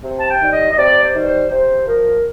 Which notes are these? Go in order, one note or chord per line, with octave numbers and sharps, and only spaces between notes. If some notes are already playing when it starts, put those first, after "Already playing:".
C3
A5
G5
D#3 G3
D#5
D#5
C3 D5
C5
D#3 G3
C5
C3 C5
F3 A#4